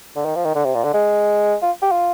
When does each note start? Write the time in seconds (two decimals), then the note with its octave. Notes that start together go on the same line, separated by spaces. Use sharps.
0.16 D3
0.26 D#3
0.35 F3
0.45 D#3
0.55 D3
0.65 C3
0.75 A#2
0.84 D3
0.94 G#3
1.62 F4
1.82 G4
1.92 F4